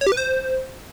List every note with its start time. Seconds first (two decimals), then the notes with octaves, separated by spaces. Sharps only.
0.01 C#5
0.07 G4
0.12 B4
0.17 C5